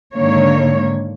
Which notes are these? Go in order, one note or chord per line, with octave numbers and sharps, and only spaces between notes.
G#2 D3 D#3 A#3 C#5